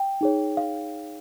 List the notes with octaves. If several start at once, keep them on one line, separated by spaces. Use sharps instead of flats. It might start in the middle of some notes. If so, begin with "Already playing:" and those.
Already playing: G5
D#4 G#4 C#5
F5